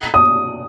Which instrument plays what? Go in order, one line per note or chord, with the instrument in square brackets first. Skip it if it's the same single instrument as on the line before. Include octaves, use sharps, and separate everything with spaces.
[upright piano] D#6